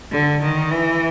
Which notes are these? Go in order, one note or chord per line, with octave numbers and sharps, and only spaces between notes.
D3
D#3
E3